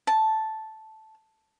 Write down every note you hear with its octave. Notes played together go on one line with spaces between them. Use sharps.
A5